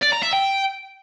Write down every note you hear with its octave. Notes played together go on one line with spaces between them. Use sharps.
D5
A#5
E5
G5